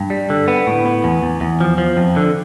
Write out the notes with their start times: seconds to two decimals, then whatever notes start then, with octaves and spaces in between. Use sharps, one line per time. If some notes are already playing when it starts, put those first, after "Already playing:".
Already playing: G2
0.10 G3
0.30 D3
0.48 B3
0.67 A2
0.86 B3
1.04 E2
1.23 E2
1.41 E2
1.61 F3
1.78 F3
1.97 F2
2.16 D3